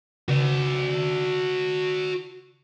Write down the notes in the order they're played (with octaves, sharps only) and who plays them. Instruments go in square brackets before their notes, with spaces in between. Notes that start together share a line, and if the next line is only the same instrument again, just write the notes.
[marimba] C#3 [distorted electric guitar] F#4 D5